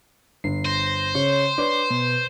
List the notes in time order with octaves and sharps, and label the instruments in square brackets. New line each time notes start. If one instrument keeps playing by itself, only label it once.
[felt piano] G1 [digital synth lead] C7
[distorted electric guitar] C5 [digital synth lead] A#6
[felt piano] C#3 [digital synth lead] C#5
[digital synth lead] D4 [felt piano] B4 C#5
[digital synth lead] B2